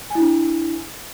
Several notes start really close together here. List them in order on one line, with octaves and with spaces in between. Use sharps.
G#5 E4 D4